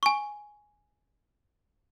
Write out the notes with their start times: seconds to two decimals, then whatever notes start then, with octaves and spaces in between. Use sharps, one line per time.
0.03 G#5 C#6